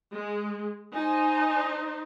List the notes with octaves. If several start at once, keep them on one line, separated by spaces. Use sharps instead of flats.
G#3
D#4 C5 G#5